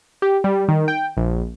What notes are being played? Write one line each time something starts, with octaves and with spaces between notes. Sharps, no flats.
G4
G3
D#3
G5
A#1